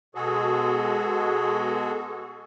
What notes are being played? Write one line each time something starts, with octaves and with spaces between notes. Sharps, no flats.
B2 G#3 F#4 G#4 A4